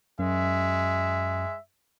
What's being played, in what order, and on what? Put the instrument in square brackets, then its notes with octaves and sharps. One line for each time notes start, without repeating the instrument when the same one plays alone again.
[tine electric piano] F#2 [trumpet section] G#3 E5